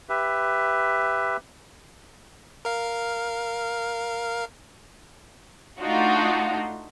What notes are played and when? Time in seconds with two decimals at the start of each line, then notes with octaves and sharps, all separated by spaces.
0.09 G4 B4 E5
2.65 A#4 F5
5.80 A3 D4 D#4 F4 F#4